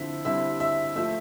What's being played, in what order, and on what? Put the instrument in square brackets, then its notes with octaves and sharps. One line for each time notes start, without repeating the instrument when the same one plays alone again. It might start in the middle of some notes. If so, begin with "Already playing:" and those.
Already playing: [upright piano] D3 F3 C4 E4 E5
D3 G3 C4 E4 E5
E5
F3 A3 E5